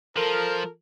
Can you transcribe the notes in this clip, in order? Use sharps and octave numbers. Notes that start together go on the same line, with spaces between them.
F3 A4 A#4